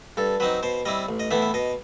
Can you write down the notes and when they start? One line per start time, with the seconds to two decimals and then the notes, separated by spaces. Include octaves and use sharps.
0.17 G2 A4
0.40 F#3 C4 D#4 B4
0.63 B2 C5
0.86 G3 C4 E4 D#5
1.09 A1
1.20 D#5
1.31 A2 E3 B3 E4 E5
1.42 E5
1.54 B2 D#5